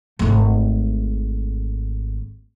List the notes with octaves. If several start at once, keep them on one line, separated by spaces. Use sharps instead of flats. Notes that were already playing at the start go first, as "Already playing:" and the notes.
G#1 A3